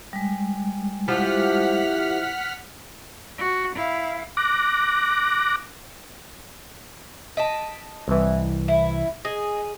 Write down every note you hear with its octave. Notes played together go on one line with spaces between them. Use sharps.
G3 G#3
F3 E4 G4 F#5 F6 B6
F#4
E4 F5
D6 F#6 A#6
D#5 A5 B6 D7
C2 E3
E4
G#4 D#5